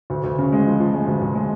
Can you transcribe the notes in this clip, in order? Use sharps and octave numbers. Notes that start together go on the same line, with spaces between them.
D2
D2
C#3
G#3
F3
F3
G#3
D2
D2
G#3